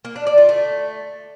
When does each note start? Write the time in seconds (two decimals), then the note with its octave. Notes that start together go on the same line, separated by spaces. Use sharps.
0.05 A#3
0.16 D4
0.27 D5
0.38 F4
0.49 A3